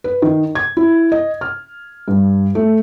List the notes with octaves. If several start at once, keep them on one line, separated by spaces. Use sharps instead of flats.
B4
D#3
G#6
E4
D#5
F6
G2
A3